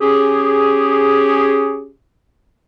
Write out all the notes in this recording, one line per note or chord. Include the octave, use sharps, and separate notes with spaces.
C#4 G4 G#4